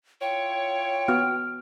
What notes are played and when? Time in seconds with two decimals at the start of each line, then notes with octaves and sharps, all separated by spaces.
0.21 E4 F4 C#5 G5
1.08 B3 F#4 F6